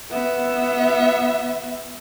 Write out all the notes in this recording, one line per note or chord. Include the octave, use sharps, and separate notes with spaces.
B3 E5